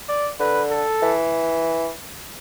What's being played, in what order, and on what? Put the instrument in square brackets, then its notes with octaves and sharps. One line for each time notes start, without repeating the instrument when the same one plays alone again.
[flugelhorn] D5
[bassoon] D3 [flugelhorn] B4
[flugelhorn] A4
[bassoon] E3